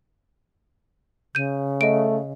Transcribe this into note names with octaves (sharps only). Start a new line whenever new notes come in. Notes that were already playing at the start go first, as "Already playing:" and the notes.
C#3 G6 D#7
A3 D#5 D7